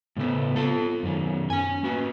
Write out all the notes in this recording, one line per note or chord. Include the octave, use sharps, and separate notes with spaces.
A2 C#3 A3 B3
F4 A4
F#2 D#3
C#4 G#5
A#3 F#4 B4